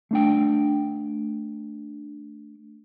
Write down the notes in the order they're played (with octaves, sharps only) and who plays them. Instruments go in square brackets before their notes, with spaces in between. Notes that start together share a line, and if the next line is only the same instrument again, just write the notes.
[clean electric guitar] A3 D4 G5